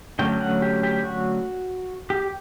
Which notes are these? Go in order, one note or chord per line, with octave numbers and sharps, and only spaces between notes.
D3 F#3 A3 C#4 G5
F#5
G4
G4
F#4
G4